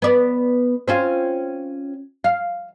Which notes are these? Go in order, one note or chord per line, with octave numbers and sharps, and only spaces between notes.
B3 D5
C4 C#4 F4
F5